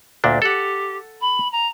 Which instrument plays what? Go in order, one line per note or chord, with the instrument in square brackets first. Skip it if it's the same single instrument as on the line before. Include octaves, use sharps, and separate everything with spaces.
[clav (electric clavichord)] D2 A#2 D4
[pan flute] G4 [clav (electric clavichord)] A4 F#5
[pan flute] B5
A#5